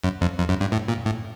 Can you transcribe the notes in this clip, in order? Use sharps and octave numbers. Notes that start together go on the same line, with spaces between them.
F#2
F2
F2
F#2
G2
A2
A#2
A2